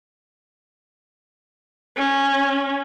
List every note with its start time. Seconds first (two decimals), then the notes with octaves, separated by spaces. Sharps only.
1.97 C#4